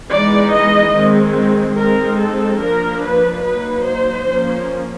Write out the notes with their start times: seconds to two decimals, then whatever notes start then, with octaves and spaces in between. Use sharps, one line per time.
0.11 E3 G#3 B3 D#4 D5
0.52 D#5
0.93 D#3 G#3 C4
1.76 G#3 C4 D#4 A#4
2.18 A4
2.59 F3 A#3 D4 A#4
3.02 B4
3.43 F#3 A#3 D#4 B4
3.86 C5
4.26 F3 A#3 C#4